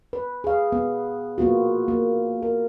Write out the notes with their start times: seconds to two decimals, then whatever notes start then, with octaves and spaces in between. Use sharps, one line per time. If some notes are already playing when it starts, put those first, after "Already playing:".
0.13 B4
0.44 G#4 F5
0.72 B3
1.38 A#3 B3 F4 F#4
1.88 A#3
2.43 A#4